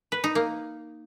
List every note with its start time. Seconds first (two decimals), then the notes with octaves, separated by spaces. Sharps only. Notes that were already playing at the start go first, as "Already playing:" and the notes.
0.12 B4
0.24 D#4
0.35 A#3